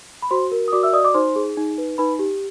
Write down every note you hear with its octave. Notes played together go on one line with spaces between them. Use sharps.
B5
F#4 C5 C6
A#4
D#6
F#4 D5 D6
E5 E6
D5 D#5 D#6
D5 D6
D#4 C5 C6
G#4
D#4
B4
D#4 B4 B5
G4